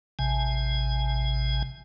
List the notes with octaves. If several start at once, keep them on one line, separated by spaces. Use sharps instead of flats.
A1 C3 G#5